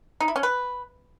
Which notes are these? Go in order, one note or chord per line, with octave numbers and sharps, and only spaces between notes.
D#4
E4
C#4
B4